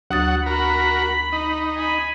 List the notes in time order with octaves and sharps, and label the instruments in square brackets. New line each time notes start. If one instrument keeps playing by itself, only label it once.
[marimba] D2 D#6 A6 [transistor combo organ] F#3 F#5
[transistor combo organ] F#4 A#4 [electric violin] B5
[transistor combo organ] D#4
[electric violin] G#5 B5